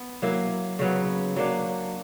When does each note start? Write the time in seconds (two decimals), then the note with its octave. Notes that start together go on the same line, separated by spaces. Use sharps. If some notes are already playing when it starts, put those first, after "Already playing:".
Already playing: B3
0.22 F#3 A#3 E4
0.79 C#3 F#3 B3
1.36 F#3 A#3 D4